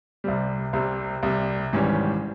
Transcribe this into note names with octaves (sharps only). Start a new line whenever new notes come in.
C2 C3 G3
C2 C3 G3
C2 C3 G3
G#1 G#2 E3 G3 C#4